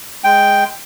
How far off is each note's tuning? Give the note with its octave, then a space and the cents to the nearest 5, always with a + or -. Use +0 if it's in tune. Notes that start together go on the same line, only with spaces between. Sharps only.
G#3 +0 G5 +0